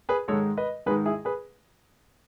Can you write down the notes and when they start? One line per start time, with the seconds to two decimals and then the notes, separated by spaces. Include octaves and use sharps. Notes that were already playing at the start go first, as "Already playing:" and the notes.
0.09 G#4 B4
0.28 G#2 D#3 G#3 A4 C#5
0.57 B4 D#5
0.86 G#2 D#3 G#3 G#4 B4
1.06 E4 G#4
1.25 G#4 B4